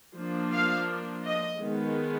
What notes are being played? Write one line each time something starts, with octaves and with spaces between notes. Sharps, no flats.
F3 A#3 D4
F5
D#5
D#3 G#3 B3